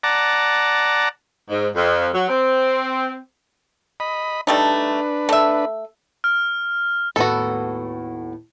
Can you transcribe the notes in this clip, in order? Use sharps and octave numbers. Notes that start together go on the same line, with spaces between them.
D5 F#5 A5 A#5
G#2
F2
F#3
C4
D#5 B5
G3 A3 D4 D#4 B4
A3 E5
F6
D#2 A2 B3 F#4 A4